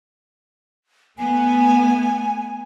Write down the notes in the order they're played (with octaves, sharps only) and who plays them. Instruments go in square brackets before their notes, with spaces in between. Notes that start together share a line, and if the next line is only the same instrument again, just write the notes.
[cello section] A3 B3 [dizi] G#5